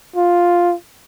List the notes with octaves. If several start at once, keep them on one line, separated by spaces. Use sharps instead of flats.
F4